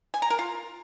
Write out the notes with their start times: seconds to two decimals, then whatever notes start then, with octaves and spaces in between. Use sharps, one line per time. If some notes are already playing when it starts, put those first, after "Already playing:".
0.14 G#5
0.22 A#5
0.30 A#4
0.39 F4